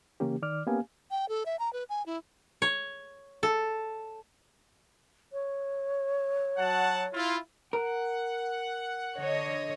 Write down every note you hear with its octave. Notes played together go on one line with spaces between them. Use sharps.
C#3 E3 A#3 C#4 G4
D#3 D5 D6 F6
A#3 B3 C#4 G4 F5 G#5
G5
A4
E5
A#5
B4
G#5
E4
C#5
A4
C#5
F#3 F#5 A5
E4 F4
A#4 F#5
D3 C#5 D#5